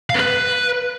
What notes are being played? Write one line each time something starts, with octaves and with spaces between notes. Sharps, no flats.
F5
B3
B4